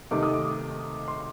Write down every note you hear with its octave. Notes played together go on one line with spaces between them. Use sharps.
C3 D#3 A3 D#4 D6
D#6
D6
C6